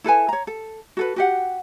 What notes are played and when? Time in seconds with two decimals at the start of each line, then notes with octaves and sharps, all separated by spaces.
0.04 E4 A4 B4 G#5
0.29 C#5 A#5
0.47 A4
0.97 F#4 A4 B4
1.16 F#4 G4 F#5